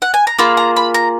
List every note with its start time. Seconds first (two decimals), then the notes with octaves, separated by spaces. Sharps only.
0.02 F#5
0.14 G#5
0.27 A#5
0.38 A#3 F4 G#4 B5
0.57 A#5
0.76 B5
0.94 A#5